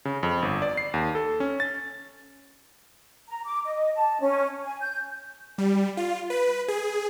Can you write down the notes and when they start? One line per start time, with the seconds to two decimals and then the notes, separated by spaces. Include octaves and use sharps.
0.05 C#3
0.23 F2
0.42 G1
0.62 D5
0.77 C7
0.94 D#2
1.15 A4
1.40 C#4
1.60 A6
3.28 A#5
3.45 D6
3.65 D#5
3.94 A5
4.21 C#4
4.64 G#5
4.81 G6
5.58 G3
5.97 F4
6.30 B4
6.68 G#4